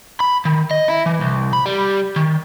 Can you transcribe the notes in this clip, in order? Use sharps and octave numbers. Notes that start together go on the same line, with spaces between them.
B5
D#3
D#5
E4
E3
C2
B5
G3
D#3